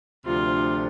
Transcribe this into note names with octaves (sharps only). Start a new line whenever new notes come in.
D2 C3 F3 A3 D4 F4